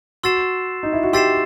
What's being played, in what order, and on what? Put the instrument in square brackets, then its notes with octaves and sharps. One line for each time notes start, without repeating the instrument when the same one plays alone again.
[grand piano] F#4 [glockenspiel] C6 E6 A6 C7 E7
[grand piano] D#4
E4
F#4
[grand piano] G4 [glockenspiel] C6 E6 A6 C7 E7